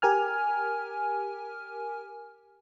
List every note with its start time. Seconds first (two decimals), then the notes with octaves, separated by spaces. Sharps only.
0.02 G4 A#4 G#5 F6